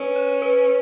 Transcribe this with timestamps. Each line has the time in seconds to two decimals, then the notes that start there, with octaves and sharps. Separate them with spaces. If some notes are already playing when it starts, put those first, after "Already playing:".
Already playing: C#4 B4
0.16 C#5
0.42 B4